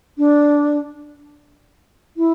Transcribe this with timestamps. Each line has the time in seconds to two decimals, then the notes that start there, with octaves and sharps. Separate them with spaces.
0.18 D4
2.17 E4